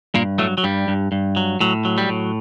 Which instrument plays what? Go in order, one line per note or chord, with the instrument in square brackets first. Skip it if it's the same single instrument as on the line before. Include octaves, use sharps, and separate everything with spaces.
[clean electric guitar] G2 A#2 A#3
A2 F#3 A3
F#3
G2 G3
G2
G2
F#3
A2 F#3
F#3
G3
A2